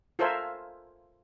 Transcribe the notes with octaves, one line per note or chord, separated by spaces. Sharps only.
F4 A4 A#4 C5 E5 G#5